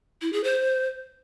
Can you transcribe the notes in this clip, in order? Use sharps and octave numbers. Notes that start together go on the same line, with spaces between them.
E4
G#4
C5